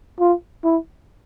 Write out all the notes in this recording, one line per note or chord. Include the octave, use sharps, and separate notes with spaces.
F4
E4